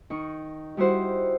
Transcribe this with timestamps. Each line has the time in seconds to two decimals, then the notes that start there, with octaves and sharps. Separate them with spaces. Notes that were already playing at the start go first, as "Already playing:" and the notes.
0.10 D#3 D#4 C#6
0.77 G3 D#4 E4 F#4 C5 F#5